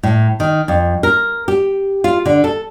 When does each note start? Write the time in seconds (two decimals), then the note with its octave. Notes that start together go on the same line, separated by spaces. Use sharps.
0.03 A2
0.40 D#3
0.68 F2
1.03 A#4
1.48 G4
2.04 F4
2.26 D3
2.44 A4